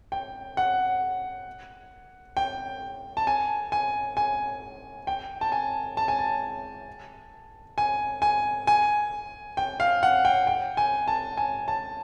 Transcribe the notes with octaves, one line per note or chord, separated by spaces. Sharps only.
G5
F#5
G5
A5
G#5
G#5
G#5
G5
A5
G#5
A5
G#5
A5
G#5
G#5
G#5
G5
F5
F#5
G5
G5
G#5
A5
G#5
A5